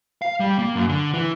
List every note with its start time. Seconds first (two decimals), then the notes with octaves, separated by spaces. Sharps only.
0.22 F5
0.40 G3
0.59 A#3
0.76 F#2
0.89 D3
1.14 E3